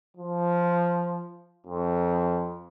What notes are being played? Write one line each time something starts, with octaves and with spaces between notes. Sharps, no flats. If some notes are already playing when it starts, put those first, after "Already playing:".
F3
F2